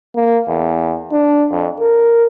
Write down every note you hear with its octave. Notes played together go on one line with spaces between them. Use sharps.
A#3
E2
D4
F2
A#4